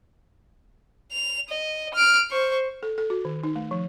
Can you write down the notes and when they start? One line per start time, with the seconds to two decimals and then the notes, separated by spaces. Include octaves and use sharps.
1.12 F7
1.49 D#5
1.94 F6 D7
2.31 C5 C#6
2.83 A4
2.98 A4
3.10 F#4
3.25 D#3
3.43 D#4
3.55 A3
3.71 F3